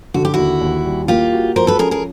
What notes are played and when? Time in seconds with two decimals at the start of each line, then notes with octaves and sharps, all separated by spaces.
0.14 D3 F#4
0.25 G4
0.34 D#2 E4 F#4
0.61 D#2
0.85 G3
1.08 A#3 F4 G4
1.33 F#4
1.55 F3 A#4 C5
1.67 A4 B4
1.79 C#4 G#4 A#4
1.91 G#4 A#4